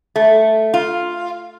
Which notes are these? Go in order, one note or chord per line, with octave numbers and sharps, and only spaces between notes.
A3
F4